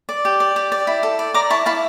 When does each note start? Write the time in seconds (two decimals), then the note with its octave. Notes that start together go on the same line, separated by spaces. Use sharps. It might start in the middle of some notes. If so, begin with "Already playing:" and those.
0.09 D5
0.25 G4
0.40 D5
0.56 G4
0.72 D5
0.87 E4
1.03 A4
1.19 D5
1.34 D5 A#5 D6
1.50 E4 A5 C#6
1.66 E4 F5 A5